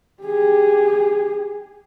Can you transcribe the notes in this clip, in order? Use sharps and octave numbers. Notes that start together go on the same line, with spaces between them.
G4 G#4